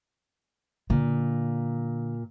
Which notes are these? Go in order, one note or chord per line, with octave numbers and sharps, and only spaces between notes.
A#2 D3